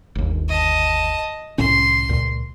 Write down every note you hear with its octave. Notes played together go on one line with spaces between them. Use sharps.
G1 D#2
D#5 A5
C2 A2 C#4 C6
C#2 A#2